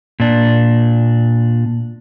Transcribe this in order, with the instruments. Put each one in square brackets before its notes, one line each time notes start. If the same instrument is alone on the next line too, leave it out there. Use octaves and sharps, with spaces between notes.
[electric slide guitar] A#2 D4